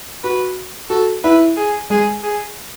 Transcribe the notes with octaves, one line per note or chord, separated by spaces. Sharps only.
F#4 B4
F#4 A4
E4 B4
G#4
G#3 G#4
G#4